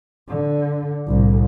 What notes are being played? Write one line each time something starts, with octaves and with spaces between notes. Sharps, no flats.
D3
C2 A2